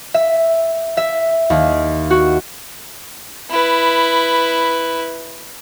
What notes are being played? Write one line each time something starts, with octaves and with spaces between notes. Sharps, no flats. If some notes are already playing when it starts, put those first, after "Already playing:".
E5
E5
D#2
F#4
E4 B4